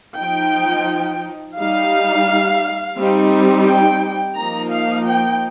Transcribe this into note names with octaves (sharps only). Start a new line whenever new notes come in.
F3 D#4 G5
G3 D#4 F5
G3 C4 D#4
G5
F3 A#3 D#4 A#5
F5
G5